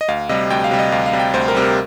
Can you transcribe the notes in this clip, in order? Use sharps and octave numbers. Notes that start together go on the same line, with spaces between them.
D#5
D2 F5
C3 G3 D#5
D2 G5
F5
C3 G3
D#5
D2 F5
F5
C3 G3
G5
D2 C5
A#4
C3 G3
A#4